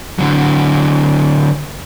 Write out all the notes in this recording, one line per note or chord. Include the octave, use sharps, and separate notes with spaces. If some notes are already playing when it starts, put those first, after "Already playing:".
D3 F#3